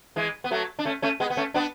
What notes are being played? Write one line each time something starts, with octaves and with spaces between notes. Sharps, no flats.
E3 G#3
B3
F#3 A3
D4
A3 C#4
A3 C#4
G#3 B3
B3
A3 C#4
B3 D4